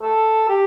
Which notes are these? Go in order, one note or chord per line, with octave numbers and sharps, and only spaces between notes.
A4
G4